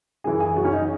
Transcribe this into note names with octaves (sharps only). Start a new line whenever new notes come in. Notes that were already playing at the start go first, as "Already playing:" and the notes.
F#2 E3 G#4
G#4
F#2 E3 F#4
C#4
D#4